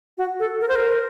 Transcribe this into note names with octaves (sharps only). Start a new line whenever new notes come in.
F#4
A4
A#4
C5
A#4